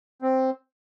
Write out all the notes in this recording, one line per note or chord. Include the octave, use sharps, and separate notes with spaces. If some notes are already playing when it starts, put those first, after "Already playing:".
C4